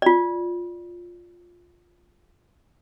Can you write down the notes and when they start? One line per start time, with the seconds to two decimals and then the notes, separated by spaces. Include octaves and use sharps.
0.02 F4 D5